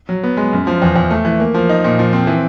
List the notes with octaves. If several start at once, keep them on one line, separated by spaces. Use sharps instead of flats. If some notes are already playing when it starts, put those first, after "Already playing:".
F#3
B3
G#3
F#2
F3
E2
E2
A3
E3
A#3
F3
D#4
A#2
F3
C4
E3